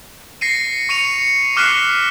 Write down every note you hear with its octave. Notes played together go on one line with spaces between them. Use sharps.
A#6 C7 C#7 D#7
C#6 C#7 D#7 F7
D6 F6 F#6 B6 C7 D#7